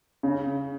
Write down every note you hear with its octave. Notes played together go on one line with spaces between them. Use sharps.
C#3